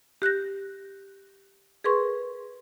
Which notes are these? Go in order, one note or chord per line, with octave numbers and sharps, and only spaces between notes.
G4 F#6 G6 A#6
G#4 A#4 B4 C6 C#6